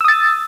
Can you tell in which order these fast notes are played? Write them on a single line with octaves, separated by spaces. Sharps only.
E6 D#6 A6